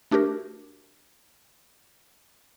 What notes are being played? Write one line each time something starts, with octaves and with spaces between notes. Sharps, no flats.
A3 D4 F#4 G4 A#4